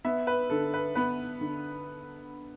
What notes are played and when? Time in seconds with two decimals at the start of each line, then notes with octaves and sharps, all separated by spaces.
0.05 B3 E5
0.27 B4
0.50 D3 A4
0.74 B4
0.95 B3 B4
1.41 D3